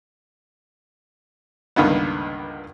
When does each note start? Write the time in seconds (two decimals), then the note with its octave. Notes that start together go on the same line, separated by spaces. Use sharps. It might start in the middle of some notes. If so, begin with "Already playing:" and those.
1.76 C#2 G2 D3 D#3 A#3 B3